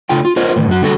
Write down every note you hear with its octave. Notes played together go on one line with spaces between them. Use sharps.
C#3 A3 F4 G5
F4
F4 A#4 C5 C#5 D#5
A2 D#3
F#2 F#4
D3 G3 F#4 A4 A#4 A#5